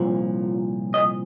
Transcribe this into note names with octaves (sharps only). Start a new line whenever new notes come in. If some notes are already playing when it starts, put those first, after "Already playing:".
Already playing: C2 A#2 F3
D#5